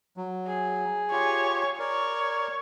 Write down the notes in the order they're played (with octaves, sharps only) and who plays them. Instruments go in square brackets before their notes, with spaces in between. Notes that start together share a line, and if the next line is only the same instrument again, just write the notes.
[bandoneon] F#3
[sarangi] G#4
[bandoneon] F4 G4 [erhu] C#5
[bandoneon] A#4 D5 [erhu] C#5